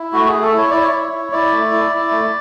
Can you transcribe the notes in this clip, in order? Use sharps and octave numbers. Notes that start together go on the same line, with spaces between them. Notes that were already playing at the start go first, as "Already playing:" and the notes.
Already playing: E4
A3 F#4
G#4
A3
A4
E4
C#5
E4 D5
C#5
E4
E4
E4 D5
A3
E4
E4
A3